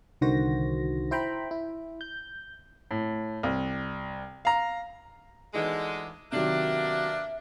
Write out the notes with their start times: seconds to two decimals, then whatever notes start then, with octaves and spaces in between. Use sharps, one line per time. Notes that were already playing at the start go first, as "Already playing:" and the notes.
0.21 C2 D3 D#3 F#4 C5 A#6
1.11 E4 C5 G5 A#5 B5
1.51 E4
2.01 G6
2.91 A2
3.43 C2
4.45 F5 A#5
5.54 D2 D3 E3 G#3 D#4 G#4
6.32 C3 D#3 F#3 A#3 B3 D4 E5